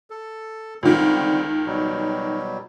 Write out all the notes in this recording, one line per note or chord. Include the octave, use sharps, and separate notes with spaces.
A4
C#2 D3 D#3 G3 C4
B2 F#3 G3